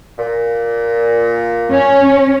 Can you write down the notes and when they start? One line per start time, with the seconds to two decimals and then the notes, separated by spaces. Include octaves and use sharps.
0.19 A#2
1.71 C#4